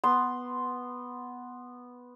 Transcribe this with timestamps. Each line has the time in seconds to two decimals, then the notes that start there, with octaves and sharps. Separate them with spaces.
0.04 B3 C6